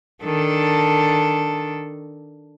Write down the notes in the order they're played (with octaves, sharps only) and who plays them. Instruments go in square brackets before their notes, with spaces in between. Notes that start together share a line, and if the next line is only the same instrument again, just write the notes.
[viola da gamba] D#3 D4 A4